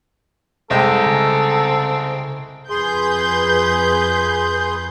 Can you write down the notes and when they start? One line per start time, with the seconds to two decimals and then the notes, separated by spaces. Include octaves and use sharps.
0.70 C2 G#3 C4 A4 G5
1.04 C#3 G#5 A#5
2.70 F2 G#4 B4 C6 G6